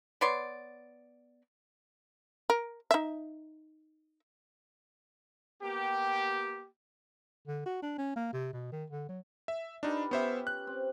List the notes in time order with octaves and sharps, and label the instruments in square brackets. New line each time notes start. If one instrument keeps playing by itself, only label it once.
[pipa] B3 C#5 D5 C6
[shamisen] A#4
D#4 E5
[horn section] A#3 B3 G4
[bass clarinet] D3
F#4
D4
C#4
A#3
C3
B2
D#3
D3
F#3
[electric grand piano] E5
[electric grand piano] D4 D#4 [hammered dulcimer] F4 G4 B4
[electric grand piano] B3 C5 E5 [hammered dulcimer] C#4 G4
[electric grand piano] F#6
[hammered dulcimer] C4